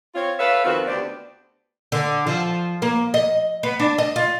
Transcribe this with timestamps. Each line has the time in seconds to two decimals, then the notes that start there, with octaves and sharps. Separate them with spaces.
0.15 C4 F4 C#5
0.39 A4 B4 C#5 E5 F5
0.64 F2 D#3 B3 C4 F4 F#4
0.87 D2 B3 C4 D4 G4
1.92 D3
2.27 F3
2.82 A#3
3.14 D#5
3.63 B3
3.80 D4
3.98 D#5
4.16 F4